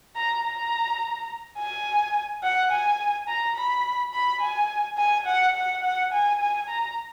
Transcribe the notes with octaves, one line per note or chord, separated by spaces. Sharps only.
A#5
A#5
G#5
F#5
G#5
A#5
B5
B5
G#5
G#5
F#5
F#5
F#5
G#5
G#5
A#5